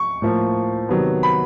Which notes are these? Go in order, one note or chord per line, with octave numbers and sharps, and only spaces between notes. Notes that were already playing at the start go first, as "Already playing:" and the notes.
Already playing: C#6
A2 F3 A#3
C3 D#3 F#3 B3
B5